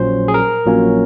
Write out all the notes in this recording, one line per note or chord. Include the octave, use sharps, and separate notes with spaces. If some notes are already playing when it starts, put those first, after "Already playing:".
Already playing: A#1 A#2 F#3 C#4 C5
G#4
A#4
A#1 A#2 F#3 A#3 C#4